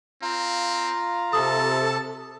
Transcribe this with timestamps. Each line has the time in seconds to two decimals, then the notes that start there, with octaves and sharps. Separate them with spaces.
0.22 C4 F4 F5 A#5
1.33 C3 A4 A5 D#6